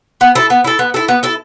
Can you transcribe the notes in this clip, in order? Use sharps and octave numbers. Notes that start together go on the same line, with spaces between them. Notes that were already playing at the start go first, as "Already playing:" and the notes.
B3
E4 A4
B3
E4 A4
B3
E4 A4
B3
E4 A4